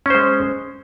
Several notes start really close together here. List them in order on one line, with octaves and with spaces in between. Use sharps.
C#4 C5 G#3